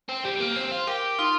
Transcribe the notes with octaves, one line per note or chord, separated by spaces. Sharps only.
C4
G3 G4
A#3
C4 C5
F4
G4 A#4
D#4 F4